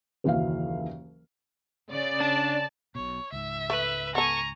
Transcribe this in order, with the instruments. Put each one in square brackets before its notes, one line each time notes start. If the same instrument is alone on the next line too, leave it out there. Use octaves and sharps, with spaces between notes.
[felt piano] F#1 D#2 E3 F#3 F5
[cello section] C#3 [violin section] D5
[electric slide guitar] D4 [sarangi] A5
[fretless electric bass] B1 B2 [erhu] C#5
[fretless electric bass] C#2 G#2 [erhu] E5
[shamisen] A3 [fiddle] B4
[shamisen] B3 A4 [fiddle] G#5 C#6 [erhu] A#5